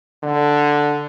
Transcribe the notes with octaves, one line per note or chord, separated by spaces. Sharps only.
D3